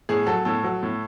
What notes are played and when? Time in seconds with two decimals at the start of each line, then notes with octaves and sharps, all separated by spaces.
0.09 A2 G#4
0.27 F#3 A4
0.45 A2 A4
0.64 F#3
0.83 A2